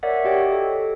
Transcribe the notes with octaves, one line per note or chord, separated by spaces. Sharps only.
A#4 C#5 D5 E5 F#5
F#4 G4 C#5 D#5 G5
A4